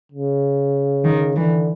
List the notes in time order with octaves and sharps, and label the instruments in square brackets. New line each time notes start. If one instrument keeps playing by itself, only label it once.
[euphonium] C#3
[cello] D#3
[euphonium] D3 [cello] E3